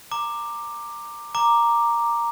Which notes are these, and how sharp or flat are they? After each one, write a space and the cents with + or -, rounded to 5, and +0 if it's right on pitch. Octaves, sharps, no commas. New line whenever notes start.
A#5 -10 D6 +10
A#5 +0 D6 +5